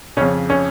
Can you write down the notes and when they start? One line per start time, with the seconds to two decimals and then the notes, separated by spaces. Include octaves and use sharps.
0.17 F2 C#3 C#4
0.50 C#4